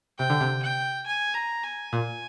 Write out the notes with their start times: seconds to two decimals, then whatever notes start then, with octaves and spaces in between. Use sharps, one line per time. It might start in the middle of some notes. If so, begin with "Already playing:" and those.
0.18 C3 G5
0.30 D3
0.41 C3
0.62 G5
1.06 G#5
1.35 A#5
1.63 G#5
1.93 A#2